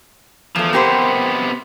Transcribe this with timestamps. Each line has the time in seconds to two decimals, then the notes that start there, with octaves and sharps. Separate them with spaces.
0.56 E2 F3 A3
0.73 C3 A#3 B3 G4 C5